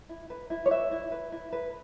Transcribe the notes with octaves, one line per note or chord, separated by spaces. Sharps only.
E4
B4
E4
C#5
B4 E5
E4
B4
E4
B4